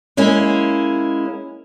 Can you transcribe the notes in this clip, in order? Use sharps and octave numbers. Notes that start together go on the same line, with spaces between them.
G#3 A#3 C#4 E4